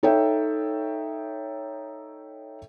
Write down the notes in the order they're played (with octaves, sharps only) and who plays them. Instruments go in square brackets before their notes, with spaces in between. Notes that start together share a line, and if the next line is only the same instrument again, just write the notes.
[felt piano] D#4 A4 C#5 E5 G5